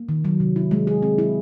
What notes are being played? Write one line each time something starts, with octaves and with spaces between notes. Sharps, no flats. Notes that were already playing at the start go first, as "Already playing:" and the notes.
Already playing: A#3
D#3
F#3
C3
E4
G#3
G#4
C4
E4